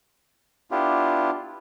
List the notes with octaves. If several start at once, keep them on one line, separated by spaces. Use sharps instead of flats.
B3 D4 E4 F4 G4